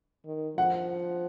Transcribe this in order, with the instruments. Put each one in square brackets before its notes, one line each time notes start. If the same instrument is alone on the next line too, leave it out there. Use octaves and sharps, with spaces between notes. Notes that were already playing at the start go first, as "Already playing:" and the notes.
[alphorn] D#3
[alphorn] F3 [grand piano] F#5